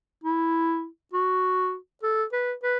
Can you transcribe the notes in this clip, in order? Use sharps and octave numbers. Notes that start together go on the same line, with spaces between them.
E4
F#4
A4
B4
B4